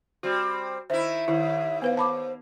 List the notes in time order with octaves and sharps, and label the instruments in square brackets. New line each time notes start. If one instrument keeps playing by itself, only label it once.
[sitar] G3 C4 [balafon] F#4
[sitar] D#3 E4 [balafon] C5 [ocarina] E5
[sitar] D#2 [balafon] D#3 E4
[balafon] B3 B4 F5 [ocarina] C5
[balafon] A5 B5 D6